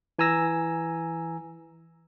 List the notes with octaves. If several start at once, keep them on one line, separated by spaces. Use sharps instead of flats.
E3 G#5 A#5 E6 A#6